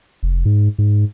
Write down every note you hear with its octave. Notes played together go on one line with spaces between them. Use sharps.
F1
G#2
G#2